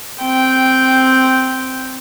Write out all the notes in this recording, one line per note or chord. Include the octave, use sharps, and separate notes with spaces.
C4 G5